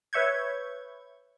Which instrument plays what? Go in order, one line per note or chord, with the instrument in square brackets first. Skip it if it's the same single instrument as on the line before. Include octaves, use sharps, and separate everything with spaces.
[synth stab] B4 C#5 E5 C#6 G6 G#6